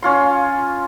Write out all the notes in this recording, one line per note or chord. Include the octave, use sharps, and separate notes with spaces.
C#4 F4 C6